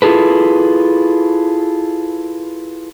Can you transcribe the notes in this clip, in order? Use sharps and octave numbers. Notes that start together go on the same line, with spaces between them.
E4 F4 G#4 A4 B4